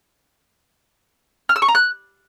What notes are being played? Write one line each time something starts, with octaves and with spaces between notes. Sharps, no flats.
F6
E6
C#6
A#5
F#6